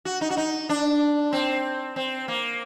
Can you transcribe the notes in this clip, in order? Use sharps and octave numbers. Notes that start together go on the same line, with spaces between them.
F#4
D#4
F#4
D#4
D4
C4
C4
A#3